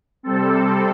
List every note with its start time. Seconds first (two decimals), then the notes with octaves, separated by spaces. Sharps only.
0.23 C3 G3 C4 A4
0.55 A4